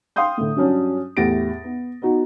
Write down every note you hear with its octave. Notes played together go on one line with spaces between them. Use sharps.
F5 G5 C6 D#6 G6
A2 D3
G2 F#3 C#4 D4
E2 A2 G4 A6 A#6 D7
B3
B3 D#4 F#4